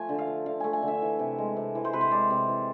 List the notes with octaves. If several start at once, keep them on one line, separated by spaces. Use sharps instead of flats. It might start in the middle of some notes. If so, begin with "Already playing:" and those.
Already playing: F3 A3 G#5
D3
F5
F3
D3 F5
A3 G#5
G#5
D3
E5
E3
C3
G#3
C3
E3
C5
C3 B4
C5
G#3 D5
C3
E3